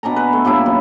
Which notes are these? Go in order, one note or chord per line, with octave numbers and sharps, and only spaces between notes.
B2 D4 G#5 A#5
B4
A3
A#2 G3 D4 E4
F#2